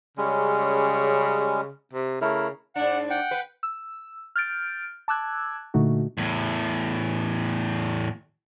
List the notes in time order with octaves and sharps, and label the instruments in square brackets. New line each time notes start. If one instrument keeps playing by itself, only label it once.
[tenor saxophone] C#3 [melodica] G3 G#3 C#4
[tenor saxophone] C3
[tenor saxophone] C#3 [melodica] A3 E4 A#4
[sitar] G#2 D4 [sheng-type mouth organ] F#5
[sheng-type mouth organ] F#5 G5
[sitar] B4
[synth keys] E6
F6 G6 A6 D7
A5 D6 E6 F#6 G#6
A#2 D3 A3 D#4 F#4
[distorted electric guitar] E2 A2